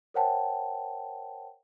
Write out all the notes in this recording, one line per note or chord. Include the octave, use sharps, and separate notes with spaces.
A#4 C5 C#5 F#5 G5 A5